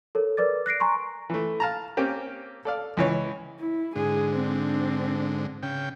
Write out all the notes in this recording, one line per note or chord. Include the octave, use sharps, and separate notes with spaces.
A4 A#4 C#5
A#4 B4 D5 D6 A6
F#6 A#6 C7 D7
G#5 A#5 C6 C#6
E3 A3
F5 A5 A#5
A#3 C4 C#4 G4
A4 D5 F5
C#2 E3 C#5
E4
G#2 D3 G#4
C4 D4
C#3 G5